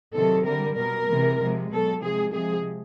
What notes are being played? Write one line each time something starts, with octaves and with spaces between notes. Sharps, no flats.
C3 D#3 F#3 A4
D3 G3 A#4
B2 G3 A#4
C3 E3 G#3
C3 F3 G#3
B2 F#3 A4
C3 F3 G#3 G#4
C3 F3 G#3 G#4